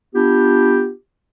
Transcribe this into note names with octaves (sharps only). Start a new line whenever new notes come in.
B3 D4 F4 G4